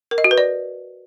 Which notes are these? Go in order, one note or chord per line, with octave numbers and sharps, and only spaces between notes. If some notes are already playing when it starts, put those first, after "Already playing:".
A#4
D#5
F#4
B4
D5